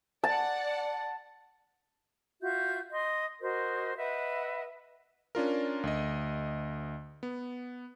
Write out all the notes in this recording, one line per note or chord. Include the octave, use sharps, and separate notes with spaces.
D5 F#5 A5
F4 F#4 E5 G6
D#5 C6
F#4 A#4 C5 D#5
B4 D#5 E5 F#5
C#4 D4 F4 A#4
D2 D#5
B3